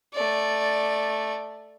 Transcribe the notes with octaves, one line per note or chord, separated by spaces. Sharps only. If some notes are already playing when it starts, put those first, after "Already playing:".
A3 D5